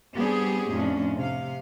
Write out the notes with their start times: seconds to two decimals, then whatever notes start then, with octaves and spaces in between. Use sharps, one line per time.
0.17 G3 B3 C4 D4 G4 G#4
0.71 F2 A2 C#4 D4
1.16 C3 F5